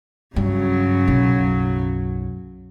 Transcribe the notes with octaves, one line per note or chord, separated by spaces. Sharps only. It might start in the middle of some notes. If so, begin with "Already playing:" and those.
G2 C#3 F#3
B1 F#2